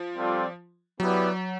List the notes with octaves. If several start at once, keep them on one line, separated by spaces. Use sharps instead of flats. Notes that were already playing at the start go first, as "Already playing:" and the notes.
Already playing: F3
G3 C4 F4 A4 D5
F#3 B3 E4 G4 B4 D5